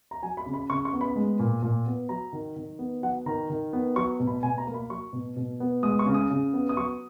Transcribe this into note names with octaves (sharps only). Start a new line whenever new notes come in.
A#5
F#3 G#5
B5
C#3
B5
C#3 C#6
C#6
B3
B5
G#3
A#2
A#2
B3
F#3 A#5
D#3
D#3
B3
F#3 F#5
D#3 A#5
D#3
B3
F#3 C#6
B2
B5
B2 G#5
A#5
A#3
B5
F#3 C#6
B2
B2
B3
G#3 D#6
C#6
C#3
D#6
C#3
B3
D#6
F#3 C#6